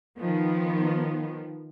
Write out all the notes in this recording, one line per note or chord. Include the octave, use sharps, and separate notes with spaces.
D#3 F3 B3